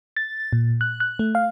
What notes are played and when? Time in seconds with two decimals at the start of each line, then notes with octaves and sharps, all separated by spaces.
0.17 A6
0.53 A#2
0.81 F#6
1.00 F#6
1.19 A3
1.35 F5